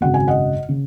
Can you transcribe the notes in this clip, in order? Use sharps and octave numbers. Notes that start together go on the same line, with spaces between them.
G#1 F#2 C#3 F#5
G#5
D#5 F#5
C#3